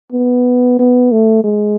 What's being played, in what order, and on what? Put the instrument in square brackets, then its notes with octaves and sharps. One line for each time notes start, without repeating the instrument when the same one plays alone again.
[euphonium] B3
B3
A3
G#3